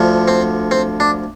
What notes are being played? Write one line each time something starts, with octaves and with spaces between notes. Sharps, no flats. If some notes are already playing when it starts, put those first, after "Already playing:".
Already playing: D2 D3 F3
C4
C4
D4